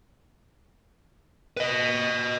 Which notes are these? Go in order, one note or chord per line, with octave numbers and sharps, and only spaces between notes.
B4 D#5